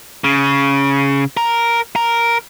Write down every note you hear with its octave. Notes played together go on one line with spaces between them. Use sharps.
C#3
A#4
A#4